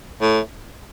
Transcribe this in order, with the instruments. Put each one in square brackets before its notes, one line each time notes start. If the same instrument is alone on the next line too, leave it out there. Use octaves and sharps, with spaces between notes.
[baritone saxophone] A2